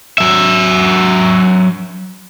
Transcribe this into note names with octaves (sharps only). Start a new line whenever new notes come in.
F#3 E5